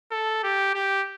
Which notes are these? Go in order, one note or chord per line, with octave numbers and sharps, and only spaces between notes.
A4
G4
G4